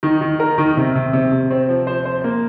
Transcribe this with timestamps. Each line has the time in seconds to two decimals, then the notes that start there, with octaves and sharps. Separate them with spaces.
0.03 D#3
0.21 D#3
0.40 A#4
0.58 D#3
0.77 C3
0.95 C3
1.13 C3
1.32 C3
1.51 C4
1.69 F3
1.87 C5
2.05 C5
2.24 A#3